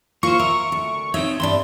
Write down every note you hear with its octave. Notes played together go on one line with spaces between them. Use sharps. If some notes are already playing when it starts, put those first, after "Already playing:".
A#3 F4 C5 C#6
A#4 E5
D2
C4 D#4 C#5 E5
G2 B3 D4 C6